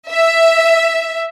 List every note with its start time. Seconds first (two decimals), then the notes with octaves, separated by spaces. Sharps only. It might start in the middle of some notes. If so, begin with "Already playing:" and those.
0.11 E5